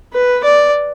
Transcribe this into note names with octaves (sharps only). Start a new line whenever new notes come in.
B4
D5